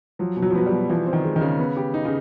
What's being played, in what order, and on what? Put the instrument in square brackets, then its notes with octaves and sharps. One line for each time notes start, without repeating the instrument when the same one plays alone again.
[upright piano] F3 [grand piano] F#3
[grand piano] B2
[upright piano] F#3
F3
[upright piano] F#3 [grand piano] B3
[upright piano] G3
[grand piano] B2
[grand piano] E3 [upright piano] F3
[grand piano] C4
[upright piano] D#3
[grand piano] G#3
[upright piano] D#3
[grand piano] C#3
B3
G4
D#4
[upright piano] C#3